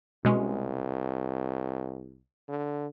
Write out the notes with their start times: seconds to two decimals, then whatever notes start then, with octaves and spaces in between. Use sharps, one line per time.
0.25 C2 B2 G#3 C#4
2.48 D3